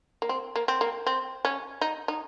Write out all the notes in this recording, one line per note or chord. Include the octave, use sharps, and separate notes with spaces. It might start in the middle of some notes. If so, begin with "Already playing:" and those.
A#3
C4
A#3
C4
A#3
C4
C#4
D#4
D#4